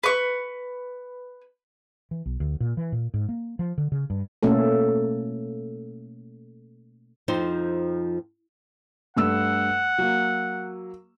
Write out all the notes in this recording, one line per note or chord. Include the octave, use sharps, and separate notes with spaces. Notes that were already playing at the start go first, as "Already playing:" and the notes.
B4 C#6
E3
B1
D2
A#2
E3
A#2
G#2
A#3
F3
D3
C#3
G2
B2 A3 A#3 C#4 A4
F2 F3 D#4 C5
G2 A3 F#5 E6
F#3 A#3